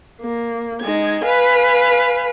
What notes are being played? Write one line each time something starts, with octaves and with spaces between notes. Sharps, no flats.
A#3
G#3 D#4 G#6
B4 F5 G#5